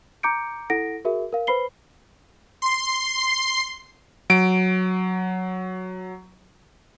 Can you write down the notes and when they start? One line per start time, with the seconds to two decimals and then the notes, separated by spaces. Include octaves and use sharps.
0.23 A#5 D6 G6 C#7 D7
0.70 E4 A4 F#5 A#6 D7
1.05 F#4 G#4 A#4 E5
1.32 A#4 F5
1.47 B4 C5 B5 C7 G7
2.62 C6 C7
4.30 F#3 D7